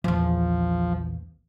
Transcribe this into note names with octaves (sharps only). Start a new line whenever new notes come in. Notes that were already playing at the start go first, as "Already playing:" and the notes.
A#1 E2 F3